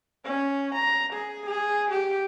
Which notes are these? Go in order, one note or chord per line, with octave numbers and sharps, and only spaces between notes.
C#4
A#5
G#4
G#4
G4